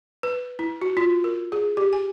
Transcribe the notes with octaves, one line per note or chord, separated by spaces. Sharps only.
B4
E4
F#4
F4
A#4
G#4
G4
G#5